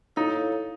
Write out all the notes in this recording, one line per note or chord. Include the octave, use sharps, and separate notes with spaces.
D#4 E4 A4 C#5 F5